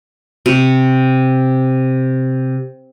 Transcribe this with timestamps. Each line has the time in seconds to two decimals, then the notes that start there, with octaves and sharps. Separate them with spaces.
0.46 C3 C#6